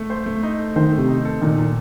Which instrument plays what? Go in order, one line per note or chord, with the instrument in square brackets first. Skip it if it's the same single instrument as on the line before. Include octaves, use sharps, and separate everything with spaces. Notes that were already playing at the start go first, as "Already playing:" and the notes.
Already playing: [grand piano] A3
C5
A3
D#4
A4
[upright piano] D#3 [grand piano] C5
[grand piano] A3
[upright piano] C3
[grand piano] D#4
A4
[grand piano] A#2 [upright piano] D#3
[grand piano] A#2